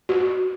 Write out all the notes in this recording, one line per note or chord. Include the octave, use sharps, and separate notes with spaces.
F#4